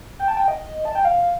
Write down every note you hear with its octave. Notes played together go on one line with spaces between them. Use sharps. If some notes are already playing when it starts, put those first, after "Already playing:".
G5
A5
G5
D#5
A5
G5
F5